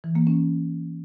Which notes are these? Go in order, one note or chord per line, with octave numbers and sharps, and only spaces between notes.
E3
A#3
C#4